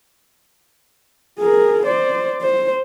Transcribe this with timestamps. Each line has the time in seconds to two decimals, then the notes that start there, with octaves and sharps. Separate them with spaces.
1.39 G#4 A#4
1.85 C5 D5
2.42 C5